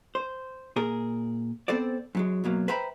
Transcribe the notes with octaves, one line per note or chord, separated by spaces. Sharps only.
C5
A#2 G#4 A#4
B3 C4 A4 C5 D5
F#2 F#3 G#3
F#2 B2 F#3 A#3
B4 C5 E5 G5 A#5 B5